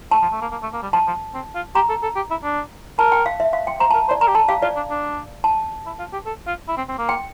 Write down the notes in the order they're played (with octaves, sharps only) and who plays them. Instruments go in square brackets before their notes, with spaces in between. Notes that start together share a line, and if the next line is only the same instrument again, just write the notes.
[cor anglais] A3 [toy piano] A5
[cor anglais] F3
A3
A#3
A#3
A3
A#3
G3
[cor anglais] F3 [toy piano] A5
[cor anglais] F3
C4
F4
[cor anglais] G4 [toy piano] A#5
[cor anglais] A4
A4
G4
E4
D4
[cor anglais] A#4 [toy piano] A5
[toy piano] G5
F5
E5
F5
G5
[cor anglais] C5 [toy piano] A#5
[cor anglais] A#4 [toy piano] A5
[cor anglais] C5
[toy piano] D5
[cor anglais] A#4 [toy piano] A#5
[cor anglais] G4
[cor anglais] A4 [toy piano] A5
[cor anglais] G4 [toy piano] F5
[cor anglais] F4 [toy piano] D5
[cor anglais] D4
D4
[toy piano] A5
[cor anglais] E4
F4
G4
A4
F4
E4
C4
C4
A#3
[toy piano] G5